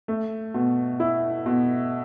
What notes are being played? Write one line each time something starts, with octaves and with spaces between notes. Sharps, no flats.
A3
B2
E4
B2